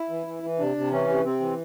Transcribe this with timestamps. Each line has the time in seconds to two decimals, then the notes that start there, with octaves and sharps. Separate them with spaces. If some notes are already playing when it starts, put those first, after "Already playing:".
Already playing: E4
0.10 E3
0.27 E3
0.43 E3
0.59 C3 D4
0.76 C3
0.91 E3 C#4
1.08 C3
1.24 C3 C4
1.40 E3